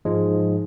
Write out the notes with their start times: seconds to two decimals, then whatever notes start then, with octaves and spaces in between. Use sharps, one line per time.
0.05 G#2 F3 G#3